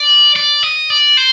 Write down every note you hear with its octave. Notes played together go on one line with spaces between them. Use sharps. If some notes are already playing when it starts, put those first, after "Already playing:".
Already playing: D5
D5
D#5
D5
C5